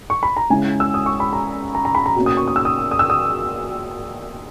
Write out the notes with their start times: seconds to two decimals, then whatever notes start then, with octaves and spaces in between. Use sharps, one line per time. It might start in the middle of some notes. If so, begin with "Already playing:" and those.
0.10 C#6
0.23 B5
0.37 A#5
0.50 C#3 G#3 C#4 E4 G#5
0.80 E6
0.94 D#6
1.06 C#6
1.20 B5
1.33 A#5
1.75 A#5
1.85 A#5
1.95 B5
2.06 A#5
2.16 B2 A#3 C#4
2.26 D#6
2.37 C#6
2.48 D#6
2.56 E6
2.65 D#6
2.91 D#6
2.99 E6
3.10 D#6